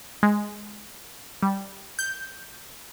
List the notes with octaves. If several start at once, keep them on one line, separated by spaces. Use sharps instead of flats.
G#3
G3
G6